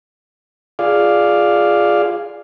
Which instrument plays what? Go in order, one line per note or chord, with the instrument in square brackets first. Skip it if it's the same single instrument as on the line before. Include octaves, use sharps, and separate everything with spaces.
[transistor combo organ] F4 G#4 D5 F5